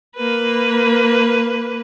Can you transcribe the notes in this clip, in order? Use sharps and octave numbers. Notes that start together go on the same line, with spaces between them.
A#3 B4